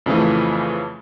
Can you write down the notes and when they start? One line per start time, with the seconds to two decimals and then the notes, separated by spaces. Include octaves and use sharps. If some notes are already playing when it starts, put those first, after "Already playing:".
0.06 F2 C#3 E3 F3 A3